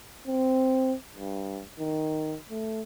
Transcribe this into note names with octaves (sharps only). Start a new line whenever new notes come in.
C4
G2
D#3
A3